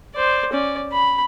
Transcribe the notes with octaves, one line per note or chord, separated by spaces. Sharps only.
C5 D5
C#4 D5
B5